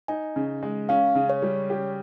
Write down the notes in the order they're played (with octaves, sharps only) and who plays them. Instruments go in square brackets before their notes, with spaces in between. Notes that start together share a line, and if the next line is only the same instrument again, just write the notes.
[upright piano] D#4 [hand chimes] G#5
[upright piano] C#3
G#3
[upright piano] C#4 [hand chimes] F5
[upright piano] C#3
[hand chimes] C#5
[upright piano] G3
G4